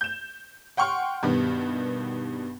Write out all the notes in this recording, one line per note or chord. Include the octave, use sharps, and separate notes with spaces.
G6 E7
F#5 G5 C6 C#6 F6
G2 B2 D#3 G3 B3